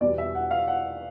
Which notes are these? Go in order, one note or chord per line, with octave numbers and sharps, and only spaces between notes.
E2 B2 G3 D5
E5
F#5
F5
F#5